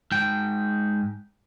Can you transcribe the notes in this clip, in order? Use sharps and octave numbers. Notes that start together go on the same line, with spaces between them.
G#2 G5